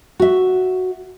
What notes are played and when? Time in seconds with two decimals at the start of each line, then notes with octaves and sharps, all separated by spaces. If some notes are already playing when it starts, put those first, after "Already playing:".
0.20 F#4 E5